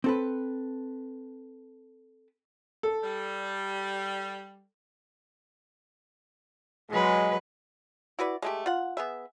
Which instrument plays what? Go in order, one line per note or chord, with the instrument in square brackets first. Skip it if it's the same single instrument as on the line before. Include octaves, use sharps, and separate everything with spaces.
[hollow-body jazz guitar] C4 A4 B4
[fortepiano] A4
[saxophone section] G3
[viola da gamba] F#3 B4 [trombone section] G#3
[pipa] E4 F#4 B4 D5
G#3 A3 G4
F4 F#5
B3 G#4 E5